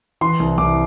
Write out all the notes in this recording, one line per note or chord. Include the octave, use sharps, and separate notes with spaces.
E3 C6
C2
C2 D6